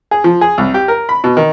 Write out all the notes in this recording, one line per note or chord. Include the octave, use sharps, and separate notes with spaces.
G#4
F3
G#4
C2
G4
A#4
B5
B2
D#3